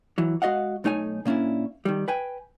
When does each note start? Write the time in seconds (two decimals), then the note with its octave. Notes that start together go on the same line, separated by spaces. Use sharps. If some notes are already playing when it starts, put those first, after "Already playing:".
0.18 E3 F#3
0.42 G#3 F#4 D#5 F5 F#5
0.84 B1 A3 D#4 C#5 G#5
1.25 A#2 A#3 C#4 D4 E4
1.85 D#3 G3
2.08 B4 G5 G#5